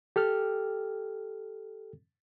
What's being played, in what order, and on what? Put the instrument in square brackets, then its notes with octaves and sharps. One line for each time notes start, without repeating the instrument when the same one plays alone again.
[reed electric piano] G4 A4 G5 F6